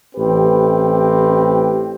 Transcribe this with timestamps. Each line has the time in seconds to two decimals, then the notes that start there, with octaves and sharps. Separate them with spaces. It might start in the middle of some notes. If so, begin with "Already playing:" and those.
0.16 A1 C4 G4 B4